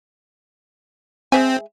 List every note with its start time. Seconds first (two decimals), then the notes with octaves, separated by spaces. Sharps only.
1.32 G#3 C4 E5 G#5